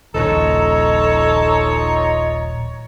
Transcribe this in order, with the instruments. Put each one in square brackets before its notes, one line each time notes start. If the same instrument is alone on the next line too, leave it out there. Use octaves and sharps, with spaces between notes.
[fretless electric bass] D#1 A#1 C#3 [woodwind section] D#4 F4 A#5 [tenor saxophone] A4 [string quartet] C#5